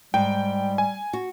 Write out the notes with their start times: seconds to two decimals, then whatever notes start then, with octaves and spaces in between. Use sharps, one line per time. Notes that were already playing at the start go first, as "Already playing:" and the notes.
0.14 G#2 G3 G5
0.78 G#5
1.13 F#4